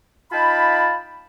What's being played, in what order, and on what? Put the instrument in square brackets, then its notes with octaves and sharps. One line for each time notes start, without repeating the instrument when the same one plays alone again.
[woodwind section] D#4 F4 F5 G5 A5 B5